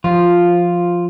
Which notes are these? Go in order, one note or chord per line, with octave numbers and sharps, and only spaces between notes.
F3 F4